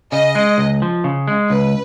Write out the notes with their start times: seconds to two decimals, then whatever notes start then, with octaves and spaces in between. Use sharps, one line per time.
0.12 C#3 D#5
0.35 G#3
0.58 C#2
0.82 F3
1.04 C#3
1.28 G#3
1.50 C#2 B4